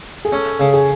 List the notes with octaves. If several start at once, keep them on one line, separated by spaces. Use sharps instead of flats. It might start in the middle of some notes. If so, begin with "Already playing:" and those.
G#4
C#4 A4
C#3
G#4